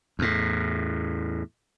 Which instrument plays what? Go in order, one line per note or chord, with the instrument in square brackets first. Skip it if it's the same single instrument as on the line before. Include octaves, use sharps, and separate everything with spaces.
[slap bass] E2 A2